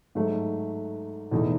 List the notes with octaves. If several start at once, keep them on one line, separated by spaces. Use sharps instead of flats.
G#2 F#3 A3
E2 B2 A3 D#4